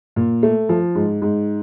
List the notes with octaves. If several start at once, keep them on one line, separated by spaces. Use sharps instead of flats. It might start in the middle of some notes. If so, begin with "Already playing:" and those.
A#2
A3
F3
G#2
G#2